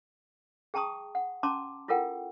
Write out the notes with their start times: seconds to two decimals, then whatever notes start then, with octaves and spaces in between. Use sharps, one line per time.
0.74 G#4 G5 A5 A#5 C#6 D#6
1.15 F#5
1.43 C#4 A5 A#5 C6 D6
1.88 E4 F4 A4 A#4 F#5 G5